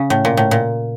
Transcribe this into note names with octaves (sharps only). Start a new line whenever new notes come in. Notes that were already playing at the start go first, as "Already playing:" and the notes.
Already playing: C#3
A2
A#2
A2
A#2